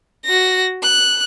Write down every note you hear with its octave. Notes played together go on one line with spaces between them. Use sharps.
F#4 A#6
F#6